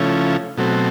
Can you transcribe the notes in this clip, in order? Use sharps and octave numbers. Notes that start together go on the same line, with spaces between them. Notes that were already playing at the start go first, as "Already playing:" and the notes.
Already playing: C#3 F3 A3 C#4 E4
B2 F#3 A3 C4